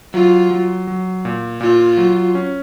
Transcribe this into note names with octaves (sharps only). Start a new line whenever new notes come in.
F#3 F4
F#3
F#3
A#2
A#2 F4
F#3
C#4